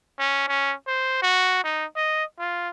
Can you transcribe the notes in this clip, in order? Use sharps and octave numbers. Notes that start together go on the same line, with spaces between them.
C#4
C#4
C5
F#4
D#4
D#5
F4